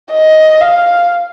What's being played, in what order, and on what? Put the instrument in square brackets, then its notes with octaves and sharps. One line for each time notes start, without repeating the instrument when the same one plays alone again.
[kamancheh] D#5
F5